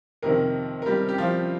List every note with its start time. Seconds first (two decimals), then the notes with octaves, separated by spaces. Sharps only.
0.22 F2 C3 D#3 A#3 A#4
0.82 A#4
0.86 G3 G4
1.09 G4
1.18 F3 F4